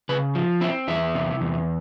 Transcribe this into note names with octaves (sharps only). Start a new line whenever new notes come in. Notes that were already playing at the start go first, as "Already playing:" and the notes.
C#3 B4
F3
C4 E4
E2 E4
C3
E2